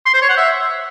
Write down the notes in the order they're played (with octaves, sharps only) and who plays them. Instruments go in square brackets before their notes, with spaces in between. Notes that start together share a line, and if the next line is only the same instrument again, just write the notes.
[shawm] C6
C5
C#5
F#5
E5